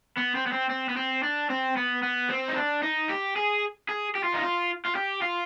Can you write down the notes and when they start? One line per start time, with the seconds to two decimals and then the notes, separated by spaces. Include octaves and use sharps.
0.17 B3
0.35 C4
0.46 B3
0.52 C4
0.69 C4
0.89 B3
0.96 C4
1.23 D4
1.50 C4
1.76 B3
2.03 B3
2.29 C4
2.48 D#4
2.56 D4
2.83 D#4
3.09 G4
3.36 G#4
3.89 G#4
4.15 G4
4.24 F4
4.34 D#4
4.42 F4
4.85 F4
4.95 G4
5.22 F4